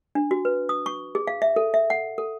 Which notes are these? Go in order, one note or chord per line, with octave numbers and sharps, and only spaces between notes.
D4
F#4
B4
D#6
C#6
G#4
F5
E5
A4
E5
F#5
A4